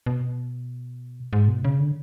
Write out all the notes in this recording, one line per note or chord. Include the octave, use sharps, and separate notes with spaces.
B2
G#2
B2
C#3
D3